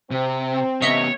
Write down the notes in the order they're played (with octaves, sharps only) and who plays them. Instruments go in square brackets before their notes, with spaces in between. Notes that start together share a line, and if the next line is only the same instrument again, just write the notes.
[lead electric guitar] C3 [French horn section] C4
[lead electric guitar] C#3 B3 [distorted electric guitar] C#5 [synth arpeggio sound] D#5 E5